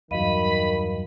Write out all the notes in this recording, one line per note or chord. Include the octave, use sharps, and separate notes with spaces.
E2 G2 D#3 F#3 D#5 F5 B5 D#7